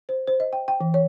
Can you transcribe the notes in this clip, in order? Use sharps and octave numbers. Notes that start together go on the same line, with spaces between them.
C5
C5
D#5
G5
G5
E3
C#5